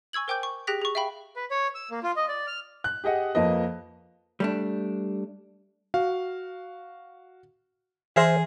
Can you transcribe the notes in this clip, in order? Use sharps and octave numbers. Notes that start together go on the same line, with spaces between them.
G#5 C#6 E6 G#6 F#7
A#4 C5 G5 G#5 D6 G6
C#6
G4 G#4 G5 F#6 A#6 B6
G#4 C#6
E5 F5 G5 B5
B4
C#5
E6
A#3
F4
D#5
D5
F6
F#6
G4 G#4 D#5 F#5
F2 F3 A#3 B4 D#5
G3 A3 D4
F#4 F5
E3 G#4 C5 E5 G#5 F6 A#6